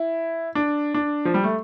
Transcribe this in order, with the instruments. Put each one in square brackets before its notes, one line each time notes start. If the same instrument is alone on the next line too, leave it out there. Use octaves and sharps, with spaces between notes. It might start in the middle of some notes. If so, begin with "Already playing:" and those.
Already playing: [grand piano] E4
D4
D4
F3
G3
A3